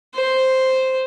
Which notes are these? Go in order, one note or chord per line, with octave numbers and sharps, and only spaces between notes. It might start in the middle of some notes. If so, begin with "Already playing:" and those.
C5